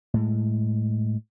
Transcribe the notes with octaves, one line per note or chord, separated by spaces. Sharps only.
A2 G#3